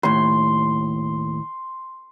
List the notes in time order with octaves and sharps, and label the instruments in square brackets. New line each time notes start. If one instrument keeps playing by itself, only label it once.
[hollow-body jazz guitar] D#2 A2 [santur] C6